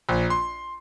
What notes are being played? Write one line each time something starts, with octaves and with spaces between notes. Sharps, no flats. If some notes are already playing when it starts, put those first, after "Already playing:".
A#1
C6